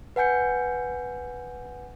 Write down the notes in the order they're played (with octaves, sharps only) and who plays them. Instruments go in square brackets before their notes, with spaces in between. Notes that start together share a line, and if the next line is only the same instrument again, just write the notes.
[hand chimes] B4 F#5 G#5 G6 C#7